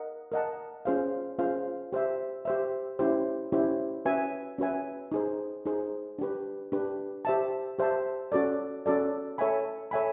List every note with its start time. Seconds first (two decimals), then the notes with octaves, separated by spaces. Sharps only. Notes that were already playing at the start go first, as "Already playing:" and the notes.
Already playing: A#4 D#5 F#5
0.32 A#4 D#5 F#5 A5
0.85 C#4 F4 G#4 C5 F5
1.39 C#4 F4 G#4 C5 F5
1.92 G4 C5 E5
2.45 G4 C5 E5
2.99 C#4 E4 G4 C5
3.52 C#4 E4 G4 C5
4.05 C#4 F#4 B4 E5 G#5
4.58 C#4 F#4 B4 E5 G#5
5.12 D#4 G#4 C5
5.65 D#4 G#4 C5
6.19 D4 G4 B4
6.72 D4 G4 B4
7.25 G4 C5 E5 A5
7.79 G4 C5 E5 A5
8.32 C#4 F#4 A4 D5
8.86 C#4 F#4 A4 D5
9.38 A4 C#5 E5 G#5 B5
9.91 A4 C#5 E5 G#5 B5